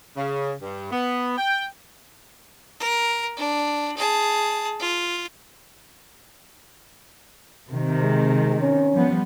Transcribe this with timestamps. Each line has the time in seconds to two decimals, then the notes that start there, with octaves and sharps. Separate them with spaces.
0.17 C#3
0.62 G2
0.92 B3
1.38 G5
2.80 A#4
3.37 D4
3.97 G#4 A5
4.80 F4
7.69 C3 D#3
8.02 G#3
8.61 C#4
8.94 F3 G3 B3